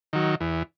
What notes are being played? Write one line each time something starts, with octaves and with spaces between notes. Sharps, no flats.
D#3 F#3
E2